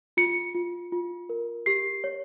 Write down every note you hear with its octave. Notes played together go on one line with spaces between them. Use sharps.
F4 C#7
F4
F4
A#4
G4 C7
C#5